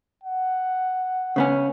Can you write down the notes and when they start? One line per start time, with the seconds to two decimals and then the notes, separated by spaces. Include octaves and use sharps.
0.23 F#5
1.36 C#3 B3 C#4